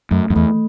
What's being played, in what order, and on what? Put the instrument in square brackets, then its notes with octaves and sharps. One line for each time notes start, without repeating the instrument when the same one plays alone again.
[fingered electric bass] F#2 [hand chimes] A3
[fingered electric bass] F#2
[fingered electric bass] E2 [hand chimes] A3